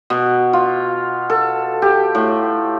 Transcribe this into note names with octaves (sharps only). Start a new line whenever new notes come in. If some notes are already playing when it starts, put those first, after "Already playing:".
B2
F4
A4
G4
A2